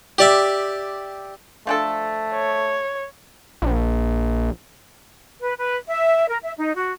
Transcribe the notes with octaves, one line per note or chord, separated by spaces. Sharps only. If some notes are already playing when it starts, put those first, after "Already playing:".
G4 D5 E5
F3 A3 D4 A4
C#5
A#1
B4
B4
E5
A#4
E5
D#4
F#4